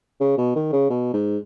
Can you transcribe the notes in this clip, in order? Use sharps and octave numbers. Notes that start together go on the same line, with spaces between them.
C#3
B2
D#3
C#3
B2
G#2